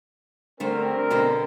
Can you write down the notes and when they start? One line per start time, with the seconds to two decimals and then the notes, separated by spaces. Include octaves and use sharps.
0.60 D3 G3 A3 C4 A#4 C5
1.10 B2 D3 C5